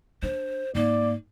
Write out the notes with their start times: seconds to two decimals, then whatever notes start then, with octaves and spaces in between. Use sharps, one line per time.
0.22 D4 C5
0.75 G#2 A#3 D5